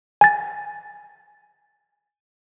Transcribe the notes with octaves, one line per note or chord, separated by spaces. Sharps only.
G#5 A6